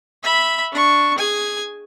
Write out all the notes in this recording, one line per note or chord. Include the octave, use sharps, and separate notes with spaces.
E5 B5
D4 C#6
G#4 G#5